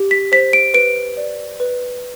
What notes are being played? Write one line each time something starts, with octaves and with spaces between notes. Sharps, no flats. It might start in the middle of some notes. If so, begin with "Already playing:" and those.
Already playing: G4
B6
C5 B6
D7
B4 D7
D5
B4